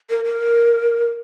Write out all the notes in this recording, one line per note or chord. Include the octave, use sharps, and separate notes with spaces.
A#4
A#4